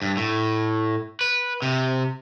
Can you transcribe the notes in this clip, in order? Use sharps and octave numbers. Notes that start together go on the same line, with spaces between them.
G2
A2
B4
C3